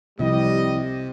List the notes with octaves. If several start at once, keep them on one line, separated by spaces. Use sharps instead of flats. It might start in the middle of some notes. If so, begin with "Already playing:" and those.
C2 C3 F3 G3 E4 G4 D#5